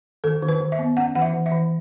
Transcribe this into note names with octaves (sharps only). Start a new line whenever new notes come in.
D#3 A4
D#3
B4
D#3
E5
B3
C#4 F#5
E3 F#5
E5
E3
E5
E3